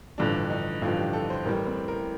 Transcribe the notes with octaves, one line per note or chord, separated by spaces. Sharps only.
A1 G2 D3 F3 D4
D#4
A1 G2 D3 F3 F4
G4
A4
C5
A1 A2 G3 A#4
C4
A#4